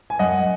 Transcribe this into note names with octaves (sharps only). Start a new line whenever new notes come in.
G#5
F#2 D#5 F#5